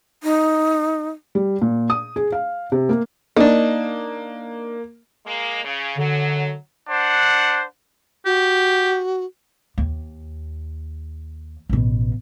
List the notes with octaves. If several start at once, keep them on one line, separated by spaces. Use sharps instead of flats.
D#4
G3
A#2
D#6
G#4
F5
C3
A#3
A#3 D4 D#4
G#3 A#3
C#3
F#2 D3 F#3
D4 C5 F#5
F#4 G4
D#2
A1 B2